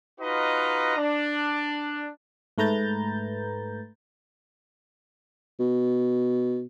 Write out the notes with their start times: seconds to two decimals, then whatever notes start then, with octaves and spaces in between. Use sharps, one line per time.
0.20 D#4 F4 F#4 B4 D#5 A#5
0.97 D4
2.58 G#2 A3 B4 A#5 G6 A6
5.59 B2